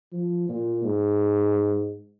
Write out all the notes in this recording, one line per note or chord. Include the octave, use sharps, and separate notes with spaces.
F3
A#2
G#2